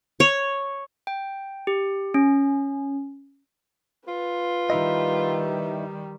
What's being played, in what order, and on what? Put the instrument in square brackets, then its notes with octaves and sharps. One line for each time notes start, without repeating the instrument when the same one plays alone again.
[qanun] C#5
[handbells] G5
G4
C#4
[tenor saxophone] F4 [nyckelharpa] B4
[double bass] D#3 G3 [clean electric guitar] D#4 E4 D#5